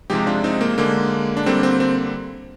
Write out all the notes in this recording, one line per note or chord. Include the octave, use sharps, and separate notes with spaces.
C3 F3 G#3 D#4 G4
D4 F4
C4 D#4
A#3
D3 G#3 A#3
D4
D3 G3 A#3 C4
C4
C4